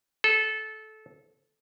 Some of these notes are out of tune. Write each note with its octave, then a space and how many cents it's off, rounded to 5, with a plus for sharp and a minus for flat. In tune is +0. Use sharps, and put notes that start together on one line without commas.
A4 -20